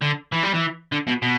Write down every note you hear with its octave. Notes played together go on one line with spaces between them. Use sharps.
D3
E3
G3
E3
D3
B2
B2